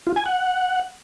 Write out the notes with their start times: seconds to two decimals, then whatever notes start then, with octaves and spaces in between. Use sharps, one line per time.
0.07 F4
0.16 G#5
0.26 F#5